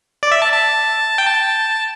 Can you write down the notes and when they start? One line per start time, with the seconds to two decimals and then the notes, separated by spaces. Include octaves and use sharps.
0.23 D5
0.31 E5
0.42 A5
0.52 A5
1.18 G5
1.26 A5